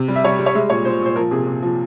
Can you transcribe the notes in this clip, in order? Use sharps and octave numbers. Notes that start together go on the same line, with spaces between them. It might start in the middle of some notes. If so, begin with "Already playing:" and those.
Already playing: C3
G3
E5
G3 C#5
G3
C#5
G#3 E5
A#2 C#5
A#2 C5
A#2 C5
F3 A#4
C3 G#4
C3
F3